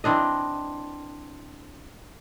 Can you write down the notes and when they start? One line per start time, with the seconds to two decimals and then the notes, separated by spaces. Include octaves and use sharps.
0.04 E3 C4 D4 D#5